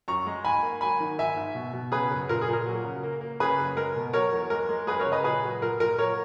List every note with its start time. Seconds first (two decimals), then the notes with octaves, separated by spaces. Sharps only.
0.08 F#2 A#5 C#6
0.27 G#3
0.44 G#2 G#5 B5
0.63 A#3
0.81 F#3 G#5 B5
1.00 D#3
1.18 G#2 E5 G#5
1.36 G#2
1.55 B2
1.73 B2
1.92 C#3 G#4 B4
2.11 F#2
2.29 A#2 A#4
2.41 G#4
2.48 A#2
2.53 A#4
2.66 F#3
2.84 C#3
3.03 A#3
3.21 A#3
3.40 C#3 G#4 B4
3.59 F#2
3.77 G#3 A#4
3.96 B2
4.13 F#3 A#4 C#5
4.33 E2
4.50 G#3 A#4
4.69 G#3
4.87 F#2 G#4 B4
5.00 A#4 C#5
5.07 C#3
5.12 B4 D#5
5.24 A#2 G#4 B4
5.43 F#3
5.62 A#2 A#4
5.80 A#2 A#4
5.98 F#3 A#4 C#5